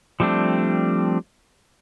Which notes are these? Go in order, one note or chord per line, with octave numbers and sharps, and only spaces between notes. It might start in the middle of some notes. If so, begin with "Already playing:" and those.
F3 G3 A3 C4 D4